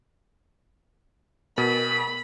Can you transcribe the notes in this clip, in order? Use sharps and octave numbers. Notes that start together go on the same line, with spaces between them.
B2 A#4 B5